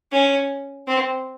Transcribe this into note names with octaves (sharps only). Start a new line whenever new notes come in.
C#4
C4